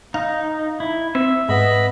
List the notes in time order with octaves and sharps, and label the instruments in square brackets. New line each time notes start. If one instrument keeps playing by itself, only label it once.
[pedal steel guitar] D#4 [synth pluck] F5
[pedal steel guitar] E4
[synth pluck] C4 [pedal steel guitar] E5
[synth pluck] G#2 [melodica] B3 D#5 B5